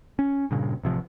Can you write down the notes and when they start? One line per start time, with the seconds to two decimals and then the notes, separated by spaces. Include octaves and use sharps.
0.19 C#4
0.51 G2 A#2 C#3
0.83 A1 C3 F3